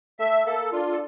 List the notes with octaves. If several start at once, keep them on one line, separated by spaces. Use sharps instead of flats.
A3 E5
A#3 A4
D4 F4
A4